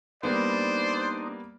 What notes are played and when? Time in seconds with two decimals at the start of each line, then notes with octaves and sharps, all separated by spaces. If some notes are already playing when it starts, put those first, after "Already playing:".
0.23 G3 A#3 B3 D4 D#4 C5 D5